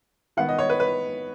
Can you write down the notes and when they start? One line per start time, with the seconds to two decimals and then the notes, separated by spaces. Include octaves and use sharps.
0.37 D#3 B3 F#5
0.49 D#5
0.59 C#5
0.70 B4
0.80 B4